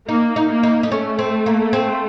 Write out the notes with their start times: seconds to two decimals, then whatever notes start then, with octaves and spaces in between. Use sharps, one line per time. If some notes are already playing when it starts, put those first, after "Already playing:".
0.08 A#3 D#4
0.36 D#4
0.50 A#3
0.63 D#4
0.83 D#4
0.91 A3 C#4
1.19 C4
1.46 A#3
1.73 C4